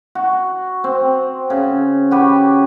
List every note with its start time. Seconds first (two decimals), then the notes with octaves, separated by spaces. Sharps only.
0.15 F#4
0.84 C4
1.50 C#3
2.11 F#4 G4 B4